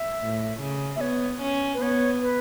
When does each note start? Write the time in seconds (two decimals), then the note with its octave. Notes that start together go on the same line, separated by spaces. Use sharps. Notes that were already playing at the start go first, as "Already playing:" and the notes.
Already playing: E5
0.21 A2
0.61 C#3
0.96 E5
1.01 B3 C#5
1.42 C#4
1.74 B4
1.82 B3 C#5
2.21 B4